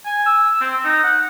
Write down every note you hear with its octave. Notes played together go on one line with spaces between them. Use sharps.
G#5
E6
C4
D#4
F#5